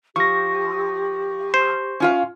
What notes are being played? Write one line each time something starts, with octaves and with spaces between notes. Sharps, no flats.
F3 G4 C#6 A#6
C5
C#4 F4 F5